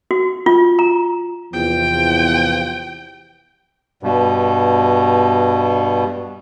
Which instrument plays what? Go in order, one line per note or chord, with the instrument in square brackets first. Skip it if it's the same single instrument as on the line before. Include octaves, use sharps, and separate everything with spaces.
[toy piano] F#4
F4
A#5
[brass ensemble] E2 C3 F3 [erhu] G5
[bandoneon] G2 B2